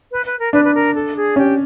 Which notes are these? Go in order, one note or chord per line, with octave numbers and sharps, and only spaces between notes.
B4
B4
A#4
D4 B4
B4
A#4
A4
G#4
C#4 G4